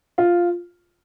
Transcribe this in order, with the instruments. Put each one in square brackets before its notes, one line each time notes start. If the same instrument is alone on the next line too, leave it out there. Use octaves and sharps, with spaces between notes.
[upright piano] F4